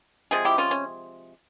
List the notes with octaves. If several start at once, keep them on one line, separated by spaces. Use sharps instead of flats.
C3 F3 G#3 G#4
E4 G4
C#4 F4
C#4